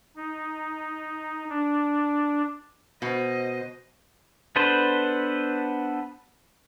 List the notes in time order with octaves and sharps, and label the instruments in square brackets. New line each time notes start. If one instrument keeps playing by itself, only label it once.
[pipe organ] D#4
D4
[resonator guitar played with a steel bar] B2 [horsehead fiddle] C5 D#5
[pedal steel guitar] B3 D4 A4 B4 C5